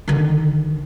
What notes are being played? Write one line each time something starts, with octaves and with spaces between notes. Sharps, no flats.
D3 D#3